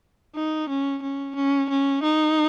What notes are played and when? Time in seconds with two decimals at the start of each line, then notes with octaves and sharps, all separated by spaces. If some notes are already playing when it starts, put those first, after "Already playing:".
0.35 D#4
0.69 C#4
1.03 C#4
1.36 C#4
1.70 C#4
2.03 D#4